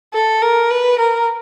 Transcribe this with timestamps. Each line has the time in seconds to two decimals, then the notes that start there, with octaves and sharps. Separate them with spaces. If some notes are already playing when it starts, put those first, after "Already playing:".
0.14 A4
0.42 A#4
0.71 B4
0.99 A#4